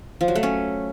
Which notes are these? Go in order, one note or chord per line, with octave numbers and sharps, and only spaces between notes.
F3
F#3
A3
C#4